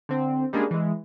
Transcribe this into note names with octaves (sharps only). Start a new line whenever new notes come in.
D3 C4
G3 G#3 A#3 C#4 D4 G#4
E3 G#3